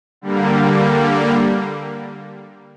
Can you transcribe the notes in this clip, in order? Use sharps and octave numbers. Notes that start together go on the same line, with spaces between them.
D3 G3 A#3